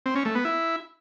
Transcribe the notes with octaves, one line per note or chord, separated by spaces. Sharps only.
C4
C#4
A3
B3
E4